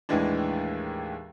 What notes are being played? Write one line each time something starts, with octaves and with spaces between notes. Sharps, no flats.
D#2 A2 E3 G#3 D4